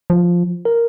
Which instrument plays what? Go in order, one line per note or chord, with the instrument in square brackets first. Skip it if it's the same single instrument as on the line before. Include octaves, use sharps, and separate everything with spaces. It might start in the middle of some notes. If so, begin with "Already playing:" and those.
[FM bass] F3
[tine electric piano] A#4